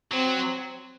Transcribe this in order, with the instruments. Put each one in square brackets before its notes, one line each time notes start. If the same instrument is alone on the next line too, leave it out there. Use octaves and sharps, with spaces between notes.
[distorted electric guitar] F#3 [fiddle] C4